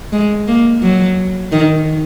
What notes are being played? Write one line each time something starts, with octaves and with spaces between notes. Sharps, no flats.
G#3
A#3
F#3
D#3